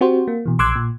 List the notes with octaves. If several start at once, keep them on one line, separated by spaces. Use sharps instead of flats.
C4 F#4 G4 C5
A#3
B2 E3
A#1 C6 D6 E6 F#6 G#6
A#2